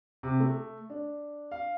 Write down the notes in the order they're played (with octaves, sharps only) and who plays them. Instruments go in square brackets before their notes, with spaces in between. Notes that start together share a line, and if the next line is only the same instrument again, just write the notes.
[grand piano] C3
A3
D4
F5